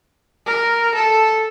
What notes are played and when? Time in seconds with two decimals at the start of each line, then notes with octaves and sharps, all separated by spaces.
0.47 A#4
0.95 A4